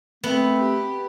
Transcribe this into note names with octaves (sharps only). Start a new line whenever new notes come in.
A3 B3 C4
G4